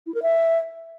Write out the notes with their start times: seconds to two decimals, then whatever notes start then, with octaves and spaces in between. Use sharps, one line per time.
0.07 E4
0.14 A#4
0.22 E5